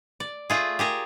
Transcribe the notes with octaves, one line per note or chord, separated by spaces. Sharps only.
D5
A3 F4 G#4
G4 G#4 A#4